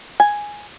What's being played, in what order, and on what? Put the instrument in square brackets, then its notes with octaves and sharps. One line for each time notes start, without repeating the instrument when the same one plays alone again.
[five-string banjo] G#5